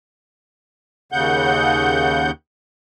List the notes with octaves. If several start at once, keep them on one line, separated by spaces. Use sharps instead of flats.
D#2 C#3 F#5 G6